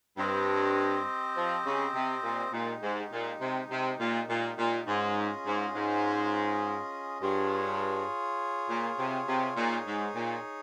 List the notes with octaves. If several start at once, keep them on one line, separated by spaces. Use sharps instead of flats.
G2 C4 G4 C5 D#5
F3
C#3
C3
A#2
A#2 G#3 D#4 G4
G#2
A#2
C3
C3
A#2
A#2
A#2
G#2 C#4 F4 G#4 D#5
G#2
G#2
G2 F4 G#4 C#5
A#2
C3
C3
A#2 D#4 G#4 C#5
G#2
A#2